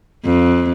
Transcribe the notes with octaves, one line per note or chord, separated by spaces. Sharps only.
F2